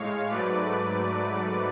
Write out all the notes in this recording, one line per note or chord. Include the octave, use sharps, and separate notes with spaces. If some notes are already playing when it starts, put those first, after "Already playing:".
Already playing: A2 G#3 C#5 F5
G#2 F#3 A3 B4 D5